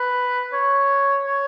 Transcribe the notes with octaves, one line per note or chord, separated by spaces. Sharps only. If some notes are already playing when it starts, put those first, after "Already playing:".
Already playing: B4
C#5
C#5